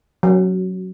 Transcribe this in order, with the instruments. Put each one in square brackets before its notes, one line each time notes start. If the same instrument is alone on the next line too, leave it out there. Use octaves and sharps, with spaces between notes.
[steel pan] F#3